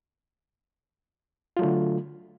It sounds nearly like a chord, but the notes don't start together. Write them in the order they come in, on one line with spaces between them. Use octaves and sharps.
F4 F#3 A3 D3